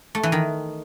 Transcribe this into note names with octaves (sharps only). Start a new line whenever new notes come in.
A3
E3
D#3